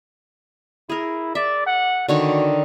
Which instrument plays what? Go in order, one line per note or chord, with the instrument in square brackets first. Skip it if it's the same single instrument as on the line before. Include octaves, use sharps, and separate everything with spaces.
[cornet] E4 [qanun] G#4 A#4
[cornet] D5 [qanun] E5
[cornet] F#5
[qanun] D3 D#3 C#5 [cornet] F#4